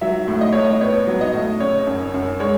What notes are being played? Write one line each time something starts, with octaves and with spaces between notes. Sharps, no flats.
F#3 E5
A2
D#5
A2 C#5
D#5
B3 C#5
F#3
D#5
A2
C#3 C#5
F#2
F#2
G#3 C#5